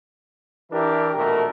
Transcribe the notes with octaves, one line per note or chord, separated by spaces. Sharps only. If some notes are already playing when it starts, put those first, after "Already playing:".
E3 D4 E4 G4 A#4
A#1 B2 A3 A#4